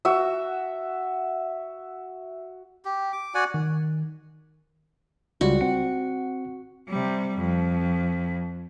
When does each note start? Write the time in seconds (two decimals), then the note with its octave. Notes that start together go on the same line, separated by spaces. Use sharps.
0.05 F#4 E5
2.85 G4
3.13 D6
3.34 F#4 D5 F#5 G#5
3.54 D#3
5.41 C#2 G3 F4 F#4
5.61 C4 F#5 C#7
6.89 C3 G3
7.37 F2